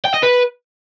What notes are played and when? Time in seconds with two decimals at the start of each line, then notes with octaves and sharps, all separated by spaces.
0.05 G5
0.14 D#5
0.23 B4